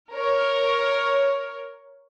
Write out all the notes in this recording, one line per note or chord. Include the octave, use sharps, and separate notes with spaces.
A#4 C#5